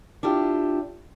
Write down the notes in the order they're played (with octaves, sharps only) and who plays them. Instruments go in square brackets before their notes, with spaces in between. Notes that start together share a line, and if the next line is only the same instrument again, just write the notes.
[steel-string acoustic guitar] D4 E4 F4 G4